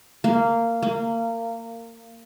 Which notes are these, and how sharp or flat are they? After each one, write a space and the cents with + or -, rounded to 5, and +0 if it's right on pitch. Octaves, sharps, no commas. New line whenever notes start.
A#3 -15
A#3 -25